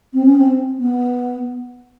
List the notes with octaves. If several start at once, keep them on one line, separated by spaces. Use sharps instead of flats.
C4
C#4
C4
B3